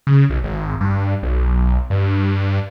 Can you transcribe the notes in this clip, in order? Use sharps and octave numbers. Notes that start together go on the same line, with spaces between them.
C#3
B1
G#1
G2
B1
G2